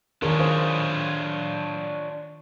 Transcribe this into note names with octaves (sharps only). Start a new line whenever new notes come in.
D#3 D4 F4 G#4 A#4 C#5
C5 F5